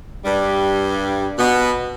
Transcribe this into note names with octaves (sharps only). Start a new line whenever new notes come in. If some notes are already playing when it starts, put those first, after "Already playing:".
G2 G3
B2 B3